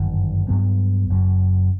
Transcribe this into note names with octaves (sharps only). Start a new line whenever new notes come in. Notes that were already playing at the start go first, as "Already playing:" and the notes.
Already playing: G1 F#2 D#3
G2 F#3 B3
F#1 F#2 F#3